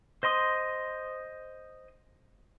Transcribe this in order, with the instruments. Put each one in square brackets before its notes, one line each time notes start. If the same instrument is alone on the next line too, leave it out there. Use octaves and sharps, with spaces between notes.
[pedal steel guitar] C5 D#5 C6 D#6